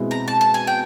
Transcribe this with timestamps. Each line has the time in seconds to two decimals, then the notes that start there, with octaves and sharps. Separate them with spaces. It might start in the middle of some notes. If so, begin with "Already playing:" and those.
Already playing: B2 G#3 C4 E4
0.11 A#5
0.28 A5
0.41 A5
0.54 G#5
0.67 G5